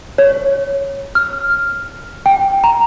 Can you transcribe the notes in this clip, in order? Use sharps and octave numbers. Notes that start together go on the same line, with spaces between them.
C#5
F6
G5
A#5